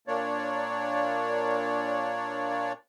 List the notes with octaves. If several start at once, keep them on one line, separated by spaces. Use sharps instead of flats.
A#2 A#3 D4 C#5 D5